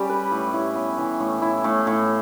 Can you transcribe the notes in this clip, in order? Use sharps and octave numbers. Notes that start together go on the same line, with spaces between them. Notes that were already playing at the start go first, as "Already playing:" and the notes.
Already playing: G3 C#4 G4
B4
A2
E4
B3
E3
A2
E4
A2
A2